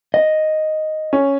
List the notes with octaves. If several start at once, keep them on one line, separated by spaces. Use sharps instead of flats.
D#5
C#4